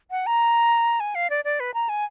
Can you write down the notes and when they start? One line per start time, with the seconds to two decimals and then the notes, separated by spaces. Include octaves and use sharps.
0.11 F#5
0.26 A#5
1.00 G#5
1.15 F5
1.30 D5
1.44 D5
1.60 B4
1.74 A#5
1.89 G#5